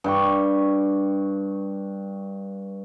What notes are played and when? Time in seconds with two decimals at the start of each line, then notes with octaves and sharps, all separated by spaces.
0.04 G2 G5 C#6